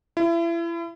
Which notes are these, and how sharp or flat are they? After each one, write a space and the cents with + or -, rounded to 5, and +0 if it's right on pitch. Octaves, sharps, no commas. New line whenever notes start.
E4 +35